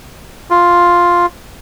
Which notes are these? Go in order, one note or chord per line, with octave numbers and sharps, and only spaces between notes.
F4